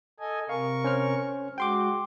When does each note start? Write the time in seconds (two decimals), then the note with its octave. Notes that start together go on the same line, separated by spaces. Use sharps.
0.20 A4 D#5 G#5
0.49 C3 A#4 F5 C#6
0.84 C#4 C5 F6
1.58 G#3 F#4 G5 C6 D6